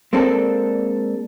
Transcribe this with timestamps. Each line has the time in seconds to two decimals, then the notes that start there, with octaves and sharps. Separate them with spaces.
0.13 G#3 A#3 C4 D4 A4